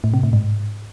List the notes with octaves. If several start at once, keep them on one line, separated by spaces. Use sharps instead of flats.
A2
C3
A2
G#2